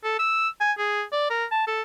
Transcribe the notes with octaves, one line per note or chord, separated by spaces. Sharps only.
A4
E6
G#5
G#4
D5
A#4
A5
A4